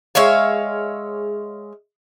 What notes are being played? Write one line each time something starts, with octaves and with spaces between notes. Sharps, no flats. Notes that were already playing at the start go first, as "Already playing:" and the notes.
G#3 C#5 E5 F5